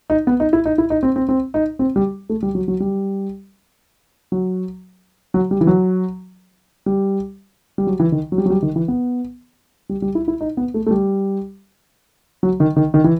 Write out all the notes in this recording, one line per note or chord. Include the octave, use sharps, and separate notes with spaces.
D#4
B3
D#4
E4
D#4
E4
D#4
C4
C4
C4
D#4
C4
G3
A3
G3
F#3
F#3
G3
F#3
F#3
G3
E3
F#3
G3
G3
F#3
E3
D#3
F#3
G3
F#3
G3
D#3
E3
B3
G3
G3
E4
E4
D#4
B3
A3
A3
G3
F#3
D#3
D#3
D#3
E3